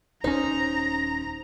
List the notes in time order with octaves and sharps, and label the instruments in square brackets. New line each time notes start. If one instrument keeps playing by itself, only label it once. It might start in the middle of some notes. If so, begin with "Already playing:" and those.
[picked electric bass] D#1 C#4 [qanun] D#4 [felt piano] C5 [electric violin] A#5